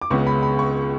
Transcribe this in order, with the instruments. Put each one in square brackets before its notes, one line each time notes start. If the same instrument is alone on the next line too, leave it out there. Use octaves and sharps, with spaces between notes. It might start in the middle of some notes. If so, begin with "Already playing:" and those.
[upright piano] D6
C#2 C#3 G#3 B3 C#6
B5
B5
C#6